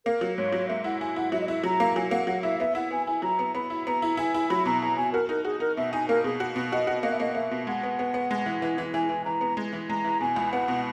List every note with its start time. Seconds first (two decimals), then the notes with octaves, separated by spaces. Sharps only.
0.06 A#3 A#4
0.21 F#3
0.37 G#2 C#5
0.53 F#3
0.68 A#3 E5
0.84 E4 F#5
1.00 E4 G#5
1.16 E4 F#5
1.32 F#3 E5
1.41 D#5
1.48 E4 E5
1.64 F#3 A#5
1.80 A#3
1.96 F#3 G#5
2.11 A#3 F#5
2.27 F#3 F#5
2.43 E4 E5
2.59 B3 E5
2.75 E4 F#5
2.91 B3 G#5
3.07 E4 G#5
3.22 F#3 A#5
3.39 B3
3.55 B3 B5
3.70 E4
3.87 B3 A#5
4.02 E4
4.17 E4 G#5
4.34 E4
4.49 F#3 B5
4.66 B2 A#5
4.82 E4 A#5
4.97 B2 G#5
5.13 F#4 A#4
5.29 D#4 A#4
5.45 F#4 G#4
5.60 D#4 A#4
5.77 B2 E5
5.93 D#4 G#5
6.08 A#3 A#4
6.24 B2 G#4
6.40 F#4
6.56 B2
6.72 F#4 D#5
6.87 F#4
7.03 A#3 D#5
7.11 E5
7.20 A#3 D#5
7.35 A#3 E5
7.51 B2
7.67 G#3 F#5
7.83 B3
7.99 B3
8.14 B3
8.31 G#3
8.46 E3
8.62 E3
8.78 E3
8.94 E3 G#5
9.09 E3
9.25 E3 A#5
9.41 B3
9.57 G#3
9.73 E3
9.90 G#3 A#5
10.05 E3
10.21 B2 G#5
10.36 C#2
10.52 B3 F#5
10.68 B2